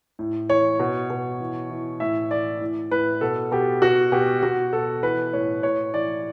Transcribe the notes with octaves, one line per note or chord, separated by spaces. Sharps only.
A2
E3 C#5
B2
B2
E3
E3
A2 E5
E3 D5
A2
A2 B4
B2 A4
B2 G4
B2 F#4
B2 G4
B2 F#4
B2 A4
E3 B4
A2 C#5
A2 C#5
E3 D5